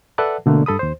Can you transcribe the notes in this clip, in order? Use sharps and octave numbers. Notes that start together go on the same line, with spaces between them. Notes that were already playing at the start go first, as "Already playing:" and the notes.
A4 B4 D5 E5 F#5 A5
B2 D3 A3 A#3
G2 A4 B5 D#6
D#2 C5